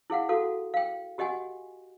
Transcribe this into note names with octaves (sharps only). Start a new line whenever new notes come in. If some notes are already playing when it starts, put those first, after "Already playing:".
E4 G#4 F5 F#5
F#4 A4 F5 F#5
F5 G5
F#4 G4 D#5 F#5 G#5